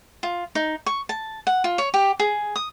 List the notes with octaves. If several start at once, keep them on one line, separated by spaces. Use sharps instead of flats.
F4
D#4
C#6
A5
F#5
F4
C#5
G4
G#4
D#6